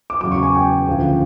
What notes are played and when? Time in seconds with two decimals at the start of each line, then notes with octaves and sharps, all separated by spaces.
0.10 D6
0.21 E2 C#3 F#3 D6
0.32 C#6
0.43 G#5
0.54 G5
0.88 D2 C#3 F3